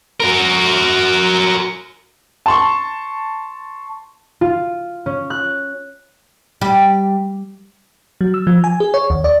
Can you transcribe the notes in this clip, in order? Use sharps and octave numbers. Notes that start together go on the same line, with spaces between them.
F#4 A#4
A5 C6 C#6
F4
C#4
F#6
G3
F#3
E6
F3
G#5
G#4
C#5
D#2
D5